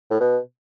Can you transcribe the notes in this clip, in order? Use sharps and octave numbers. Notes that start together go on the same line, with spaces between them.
A2
B2